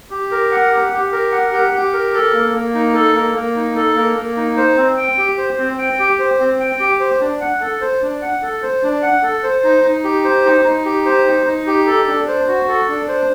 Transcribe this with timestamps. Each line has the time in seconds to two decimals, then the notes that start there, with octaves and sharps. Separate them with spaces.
0.10 G4
0.31 A#4
0.51 F#5
0.72 G4
0.92 G4
1.12 A#4
1.32 F#5
1.52 G4
1.73 G4
1.93 A#4
2.14 A4
2.34 A#3
2.54 A#3
2.74 D#4
2.94 A4
3.14 A#3
3.35 A#3
3.56 D#4
3.76 A4
3.96 A#3
4.16 A#3
4.37 D#4
4.57 C5
4.77 C4
4.97 G5
5.18 G4
5.38 C5
5.58 C4
5.78 G5
5.99 G4
6.19 C5
6.40 C4
6.60 G5
6.80 G4
7.00 C5
7.21 D4
7.41 F#5
7.61 A4
7.81 C5
8.02 D4
8.22 F#5
8.42 A4
8.62 C5
8.83 D4
9.02 F#5
9.23 A4
9.43 C5
9.64 D#4
9.84 D#4
10.04 G4
10.24 C5
10.45 D#4
10.65 D#4
10.85 G4
11.05 C5
11.26 D#4
11.46 D#4
11.67 G4
11.86 A4
12.07 D4
12.28 C5
12.48 F#4
12.68 A4
12.88 D4
13.08 C5